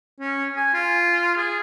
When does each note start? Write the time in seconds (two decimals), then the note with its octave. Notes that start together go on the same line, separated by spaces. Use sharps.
0.20 C#4
0.56 G#5
0.74 F4
1.37 G#4